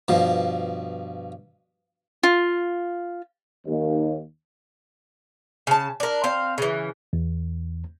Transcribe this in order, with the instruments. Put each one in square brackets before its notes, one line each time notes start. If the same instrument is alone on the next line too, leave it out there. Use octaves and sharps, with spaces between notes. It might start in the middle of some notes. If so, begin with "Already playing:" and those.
[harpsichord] G2 B2 F3
[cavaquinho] F4
[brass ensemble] D#2
[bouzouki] C#3 A5
D4 A#4
C4 F5
C#3 E3
[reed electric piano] E2